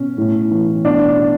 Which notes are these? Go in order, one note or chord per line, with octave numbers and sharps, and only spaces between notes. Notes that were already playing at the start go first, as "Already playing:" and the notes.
Already playing: B2 C#4
A2
E3
B2 D4
B2